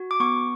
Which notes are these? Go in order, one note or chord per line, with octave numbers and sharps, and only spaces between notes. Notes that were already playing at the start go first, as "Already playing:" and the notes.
Already playing: F#4
D6
B3 C#6